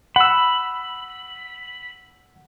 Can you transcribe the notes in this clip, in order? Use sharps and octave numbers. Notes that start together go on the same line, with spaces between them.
F#5 B5 E6